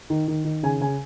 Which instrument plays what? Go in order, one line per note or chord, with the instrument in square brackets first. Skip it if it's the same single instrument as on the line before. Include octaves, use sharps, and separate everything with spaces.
[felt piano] D#3
D#3
D#3
C#3 G#5
C#3 G#5